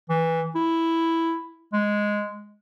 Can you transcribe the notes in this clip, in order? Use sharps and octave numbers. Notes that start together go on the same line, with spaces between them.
E3
E4
G#3